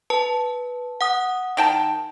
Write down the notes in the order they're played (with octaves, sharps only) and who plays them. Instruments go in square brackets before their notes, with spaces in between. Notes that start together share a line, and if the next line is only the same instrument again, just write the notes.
[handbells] B4 A5
F#5 D#6
[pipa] D#3 G5 A5